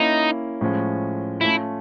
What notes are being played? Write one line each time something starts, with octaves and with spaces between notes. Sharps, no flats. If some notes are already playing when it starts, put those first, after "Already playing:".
Already playing: A#3 C#4 D#4 E4
A2 F3 G#3 C#4 F4
A3 C#4 E4 F4